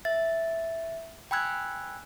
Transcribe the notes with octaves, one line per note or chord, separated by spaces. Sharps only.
E5 A6
G5 G#5 B5 E6 F#6 G#6